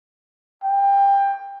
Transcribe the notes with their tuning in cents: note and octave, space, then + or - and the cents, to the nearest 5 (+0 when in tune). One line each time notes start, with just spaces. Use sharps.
G5 +20